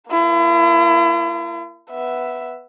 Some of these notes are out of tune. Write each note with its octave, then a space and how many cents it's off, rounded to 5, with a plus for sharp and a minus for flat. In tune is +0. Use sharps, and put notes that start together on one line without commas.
A#3 +0 E4 +40
B3 +0 E5 +0